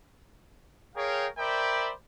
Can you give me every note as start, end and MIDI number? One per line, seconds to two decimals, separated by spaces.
0.96 1.27 68
0.96 1.27 70
0.96 1.27 73
0.96 1.27 77
0.96 1.27 79
1.38 1.92 70
1.38 1.92 72
1.38 1.92 74
1.38 1.92 76
1.38 1.92 79
1.38 1.92 83